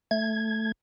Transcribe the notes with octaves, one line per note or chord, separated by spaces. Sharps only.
A3 G#6